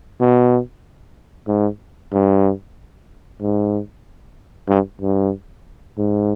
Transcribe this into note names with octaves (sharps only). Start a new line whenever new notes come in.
B2
G#2
G2
G#2
G2
G2
G#2